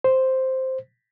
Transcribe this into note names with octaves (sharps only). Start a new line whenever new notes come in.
C5